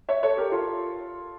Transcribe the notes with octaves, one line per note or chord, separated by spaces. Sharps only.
C#5 E5
A4 C#5
G4 A#4
F4 A4